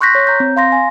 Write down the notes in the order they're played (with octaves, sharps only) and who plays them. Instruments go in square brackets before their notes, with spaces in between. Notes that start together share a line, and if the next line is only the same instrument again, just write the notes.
[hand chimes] C6 C#6 F#6 G6 A#6 B6
C#5
A#5 G6
C4
F5 C6 A#6
G#5